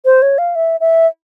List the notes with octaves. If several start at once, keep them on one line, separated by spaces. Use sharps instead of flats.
C5
C#5
F5
E5
E5